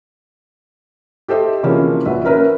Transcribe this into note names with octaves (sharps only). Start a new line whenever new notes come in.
G4 A4 C5 D#5 E5
C3 E3 F3 A#3 C#4 G#4
A#1 F#4 B4 E5
C#4 A#4 B4 E5